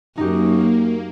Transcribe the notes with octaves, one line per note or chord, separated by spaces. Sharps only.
F#2 A#3 D#4 G4